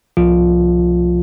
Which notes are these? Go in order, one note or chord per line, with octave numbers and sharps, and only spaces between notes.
C2 F3 F4